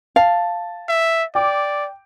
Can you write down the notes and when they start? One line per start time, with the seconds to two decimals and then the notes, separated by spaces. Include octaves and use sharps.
0.16 F5 A5
0.89 E5
1.35 D5 G5 D6